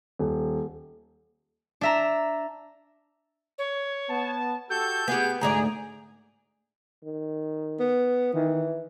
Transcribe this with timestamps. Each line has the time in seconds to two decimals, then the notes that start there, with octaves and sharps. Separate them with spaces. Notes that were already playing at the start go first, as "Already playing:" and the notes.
0.19 D#1
1.81 D4 E5 A#5
3.58 C#5
4.10 B3 A5
4.70 F#4 G4 A4 G6
5.08 B3 G4 G#4
5.41 D2 G#2 G#4 D5 A#5
7.04 D#3
7.80 B3
8.34 D#3 E3